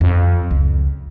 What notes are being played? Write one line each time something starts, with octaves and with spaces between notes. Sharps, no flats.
F2
C#2